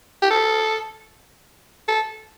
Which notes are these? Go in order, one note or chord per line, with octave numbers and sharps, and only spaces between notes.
G4
A4
A4